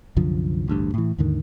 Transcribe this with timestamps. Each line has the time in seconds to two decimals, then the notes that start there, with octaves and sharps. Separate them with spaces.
0.16 C2 F#2 D3 F3
0.68 A1 D2 G2
0.94 A2 E3
1.18 D#2 G#2 D3 D#3